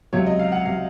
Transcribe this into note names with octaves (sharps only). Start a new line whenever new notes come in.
C#2 C3 F#3 C#5
D#5
F5
F#5
C3 F#3 F5